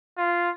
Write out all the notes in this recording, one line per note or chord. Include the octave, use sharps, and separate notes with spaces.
F4